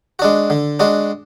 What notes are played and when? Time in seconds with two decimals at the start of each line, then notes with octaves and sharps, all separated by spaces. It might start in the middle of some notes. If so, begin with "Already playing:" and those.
0.19 G#3 D4 F#4
0.50 D3
0.80 G#3 D4 F#4